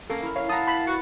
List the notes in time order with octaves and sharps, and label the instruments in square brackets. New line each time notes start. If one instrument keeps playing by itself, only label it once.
[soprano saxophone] A#3 [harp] C#4 [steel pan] A4
[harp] E4 A#4
[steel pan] C#5 [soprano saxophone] F5
[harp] E4 F#5 [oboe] A5 [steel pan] A#5 D#6
[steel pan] B5
[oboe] F#4 [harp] B4 A6 C#7